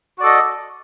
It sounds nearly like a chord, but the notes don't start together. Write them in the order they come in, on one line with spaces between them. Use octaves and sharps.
F#4 D5 A4 D#5